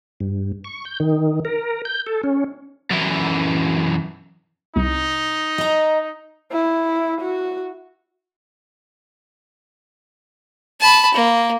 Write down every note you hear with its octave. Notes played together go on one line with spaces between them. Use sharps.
G2
C#6
G6
D#3
A#4
G6
A4
C#4
F#2 E3
C2 D#4
D#5 A#5
E4
F#4
A5 B5
A#3